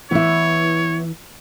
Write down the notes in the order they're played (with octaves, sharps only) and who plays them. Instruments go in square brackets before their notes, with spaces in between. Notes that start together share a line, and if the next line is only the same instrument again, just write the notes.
[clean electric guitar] E3 [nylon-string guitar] B3 E4 [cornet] C#5